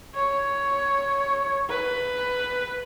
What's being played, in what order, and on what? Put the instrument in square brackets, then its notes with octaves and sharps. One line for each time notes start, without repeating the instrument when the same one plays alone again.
[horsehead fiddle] C#5
B4